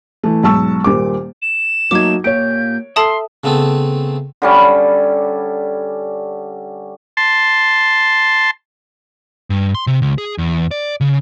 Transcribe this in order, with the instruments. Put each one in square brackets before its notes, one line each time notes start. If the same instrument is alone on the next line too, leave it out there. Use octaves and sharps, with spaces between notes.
[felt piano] E3 A3
B1 G#2 A5 C#6 E6
D#1 A#2 D6
[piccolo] E7
[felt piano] F#3 D#4 [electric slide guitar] A3 A#3 [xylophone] D6 G#6
[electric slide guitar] A#2 A#3 G4 [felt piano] C#5 D7 [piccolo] G6
[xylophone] A4 A5 D#6 [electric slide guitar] E5 [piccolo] C6
[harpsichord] C#3 A3 B3 C4 A4
[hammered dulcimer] D3 G3 C#4
[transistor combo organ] A5 C6
[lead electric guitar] G2
C6
C3
C#2
G#4
E2
D5
C#3